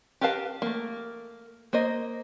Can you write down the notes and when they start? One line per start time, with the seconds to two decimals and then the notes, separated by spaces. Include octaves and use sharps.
0.21 G4 A#4 B4 F5 A5
0.62 A3 A#3
1.73 A#3 C5 D#5